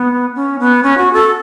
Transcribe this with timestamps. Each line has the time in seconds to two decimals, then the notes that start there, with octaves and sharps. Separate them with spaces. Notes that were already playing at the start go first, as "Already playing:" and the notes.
Already playing: B3
0.35 C#4
0.59 B3
0.83 C#4
0.98 F#4
1.13 A4